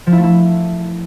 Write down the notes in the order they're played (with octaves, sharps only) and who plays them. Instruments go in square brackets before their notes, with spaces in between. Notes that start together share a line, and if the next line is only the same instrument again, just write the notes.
[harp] F3
E4
A3
E4